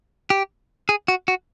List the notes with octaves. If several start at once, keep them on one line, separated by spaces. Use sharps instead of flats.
G4
G#4
F#4
F#4